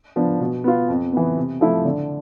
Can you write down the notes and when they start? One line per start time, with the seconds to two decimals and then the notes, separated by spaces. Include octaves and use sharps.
0.16 F3 B3 D4
0.40 B2
0.64 B3 F4
0.89 F2
1.12 E3 B3
1.37 C3
1.61 F3 A3 E4
1.85 D3